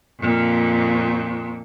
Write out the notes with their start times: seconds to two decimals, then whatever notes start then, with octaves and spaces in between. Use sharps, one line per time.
0.20 F2 A#2